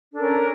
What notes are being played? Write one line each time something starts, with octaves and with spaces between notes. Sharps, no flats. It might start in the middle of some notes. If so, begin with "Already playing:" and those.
C#4 D4 A4 A#4